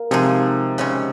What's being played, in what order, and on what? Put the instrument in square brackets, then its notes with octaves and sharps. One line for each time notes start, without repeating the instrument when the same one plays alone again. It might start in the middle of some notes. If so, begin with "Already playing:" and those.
Already playing: [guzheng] A#3
[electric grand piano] C3 [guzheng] F3 G#3 D#4 G#4
[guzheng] C#3 G#3 C#4